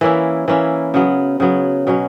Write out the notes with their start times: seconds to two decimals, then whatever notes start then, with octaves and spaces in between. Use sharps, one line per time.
0.01 E3 A#3 C#4 E4
0.48 E3 A#3 C#4 E4
0.94 C#3 F#3 B3
1.40 C#3 F#3 B3
1.87 B2 F#3 C#4